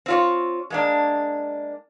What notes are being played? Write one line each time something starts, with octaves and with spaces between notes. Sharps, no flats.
C4 F4 C#5
G#3 A#3 D4